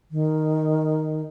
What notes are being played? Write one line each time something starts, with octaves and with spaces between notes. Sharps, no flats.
D#3